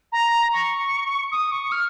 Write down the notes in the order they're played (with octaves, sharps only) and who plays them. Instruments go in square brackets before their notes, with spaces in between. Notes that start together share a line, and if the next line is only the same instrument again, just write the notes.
[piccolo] A#5
C#6
D#6
C#6
F6